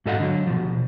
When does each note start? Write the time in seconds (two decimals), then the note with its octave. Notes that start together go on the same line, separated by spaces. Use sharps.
0.06 G#2 F#4 A4 D#5 F5 F#5
0.19 D3 F#3
0.47 B2 F3